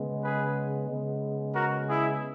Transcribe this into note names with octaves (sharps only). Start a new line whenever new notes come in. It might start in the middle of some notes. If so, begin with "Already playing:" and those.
Already playing: C#3 G#3 B3
G#4 B4
C#3 G#3 B3
F#4 A#4
E4 G#4